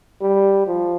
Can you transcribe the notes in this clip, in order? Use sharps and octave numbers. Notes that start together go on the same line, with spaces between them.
G3
F3